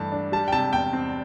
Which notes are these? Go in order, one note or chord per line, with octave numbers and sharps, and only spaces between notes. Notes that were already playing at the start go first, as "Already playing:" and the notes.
Already playing: G2 E3 A3 A5
D4
G3 A5
G5
C3 A5
E2 G5
C4